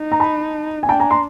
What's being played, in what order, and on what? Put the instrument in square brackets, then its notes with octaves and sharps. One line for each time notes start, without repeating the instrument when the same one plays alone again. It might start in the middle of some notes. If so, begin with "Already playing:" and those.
Already playing: [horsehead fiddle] D#4
[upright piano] A#5
A5 B5
G#5
[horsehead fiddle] D4 [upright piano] G5 A5
[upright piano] G#5 A#5
A#5 C6